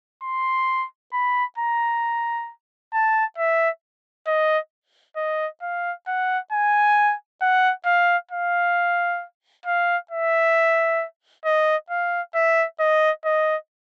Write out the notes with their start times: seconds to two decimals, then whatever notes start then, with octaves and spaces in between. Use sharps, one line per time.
0.23 C6
1.13 B5
1.58 A#5
2.93 A5
3.38 E5
4.27 D#5
5.17 D#5
5.62 F5
6.08 F#5
6.52 G#5
7.42 F#5
7.86 F5
8.31 F5
9.66 F5
10.11 E5
11.45 D#5
11.90 F5
12.35 E5
12.80 D#5
13.25 D#5